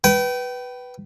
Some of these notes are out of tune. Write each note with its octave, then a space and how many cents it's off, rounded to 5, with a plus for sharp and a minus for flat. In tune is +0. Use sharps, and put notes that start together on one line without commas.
B4 +0 G5 -30